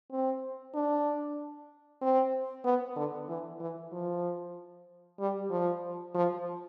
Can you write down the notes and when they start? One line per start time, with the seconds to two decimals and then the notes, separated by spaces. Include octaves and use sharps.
0.11 C4
0.74 D4
2.01 C4
2.64 B3
2.96 D3
3.28 E3
3.60 E3
3.92 F3
5.19 G3
5.50 F3
6.14 F3